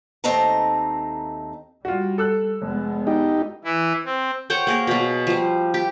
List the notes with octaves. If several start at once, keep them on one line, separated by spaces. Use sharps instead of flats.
D#2 A3 C4 D#4 A5 A#5
G3 F4 F#4
A4 E6 F#6
F1 G#3 B3
D#4 G4
E3 E4
C4
C5 C#5 F#5 G5
A#3 G#4 A#4
B2 F#3
F3 G3
G4